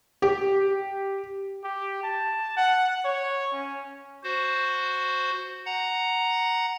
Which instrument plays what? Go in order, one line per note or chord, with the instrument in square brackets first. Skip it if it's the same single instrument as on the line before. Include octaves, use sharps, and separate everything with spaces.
[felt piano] G4
[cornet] G4
A5
F#5
C#5
C#4
[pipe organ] F#4 C5
F#5 A#5